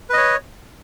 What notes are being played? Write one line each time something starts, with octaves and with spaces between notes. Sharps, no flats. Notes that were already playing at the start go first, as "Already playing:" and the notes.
B4 C#5 D#5